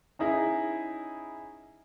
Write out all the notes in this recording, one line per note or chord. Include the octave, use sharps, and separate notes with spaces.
C#4 D#4 E4 G#4